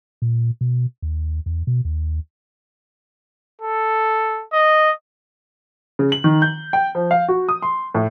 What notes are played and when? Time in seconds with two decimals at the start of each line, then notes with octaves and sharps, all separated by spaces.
0.22 A#2
0.61 B2
1.02 D#2
1.46 E2
1.67 B2
1.85 D#2
3.62 A4
4.53 D#5
5.99 C#3
6.12 F#7
6.24 D#3
6.42 G6
6.73 G5
6.95 F3
7.11 F5
7.28 F#4
7.49 D#6
7.62 C6
7.95 A2